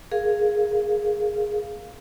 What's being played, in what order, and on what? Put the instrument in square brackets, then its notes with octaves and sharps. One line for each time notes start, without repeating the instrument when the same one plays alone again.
[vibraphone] G#4 A#4 F5